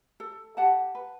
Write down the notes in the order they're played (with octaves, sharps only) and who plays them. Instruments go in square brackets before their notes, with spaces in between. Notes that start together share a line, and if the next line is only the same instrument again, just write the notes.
[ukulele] A4
G4 F#5 A5
B4